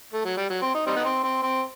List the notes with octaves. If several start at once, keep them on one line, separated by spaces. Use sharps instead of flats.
A3
F#3
G3
F#3
C4
D#4
G3 C4 D#4
B3
C4
C4
C4